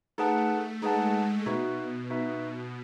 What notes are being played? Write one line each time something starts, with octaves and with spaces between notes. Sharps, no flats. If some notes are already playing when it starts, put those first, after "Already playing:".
A3 D#4 G#4 B4 F#5 A5
G#3 D#4 G#4 B4 F#5 A5
B2 D#4 F#4 B4 E5
D#4 F#4 B4 E5